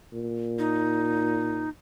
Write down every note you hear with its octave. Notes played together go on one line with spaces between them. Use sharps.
A#2
D#4